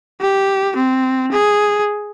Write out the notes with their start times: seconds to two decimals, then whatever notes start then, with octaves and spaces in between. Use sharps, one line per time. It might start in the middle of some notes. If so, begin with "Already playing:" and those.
0.21 G4
0.76 C4
1.32 G#4